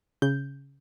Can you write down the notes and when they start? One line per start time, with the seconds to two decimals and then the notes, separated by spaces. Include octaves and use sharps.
0.22 C#3 G6